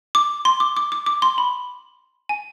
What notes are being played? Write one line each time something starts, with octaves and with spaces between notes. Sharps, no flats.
D6
C6
D6
D6
D6
D6
C6
B5
G#5